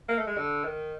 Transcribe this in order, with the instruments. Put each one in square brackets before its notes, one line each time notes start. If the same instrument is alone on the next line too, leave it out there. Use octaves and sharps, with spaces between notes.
[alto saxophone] A#3
A3
G#3
D3
D#3